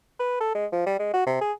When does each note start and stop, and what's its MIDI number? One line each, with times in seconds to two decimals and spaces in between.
0.20 0.36 71
0.40 0.52 69
0.55 0.66 56
0.72 0.83 53
0.86 0.95 55
1.00 1.14 56
1.14 1.26 66
1.27 1.39 48
1.41 1.53 68